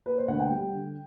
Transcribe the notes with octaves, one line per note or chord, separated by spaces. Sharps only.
A#3 B4
C5
D2 F#5
G5
G3
D3